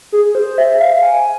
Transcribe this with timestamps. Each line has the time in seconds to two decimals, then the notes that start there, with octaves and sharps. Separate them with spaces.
0.12 G#4
0.35 C5
0.58 E5
0.71 E5
0.80 F5
1.03 G#5